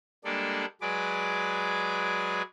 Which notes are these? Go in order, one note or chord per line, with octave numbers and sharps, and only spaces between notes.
G3 G#3 A#3 D4 A4 D5
F#3 G#3 G#4 B4 D5 D6